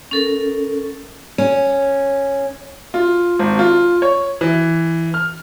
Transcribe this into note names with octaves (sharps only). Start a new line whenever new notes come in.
C#4 A4 A#4
C#4
F4
G#1
F4
C#5
E3
F6